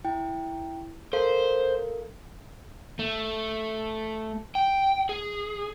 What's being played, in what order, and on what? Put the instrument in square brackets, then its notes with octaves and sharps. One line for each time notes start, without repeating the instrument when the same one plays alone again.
[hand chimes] E4 G5
[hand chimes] A4 A#4 F5 [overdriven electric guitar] C5
[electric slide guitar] A3
G5
G#4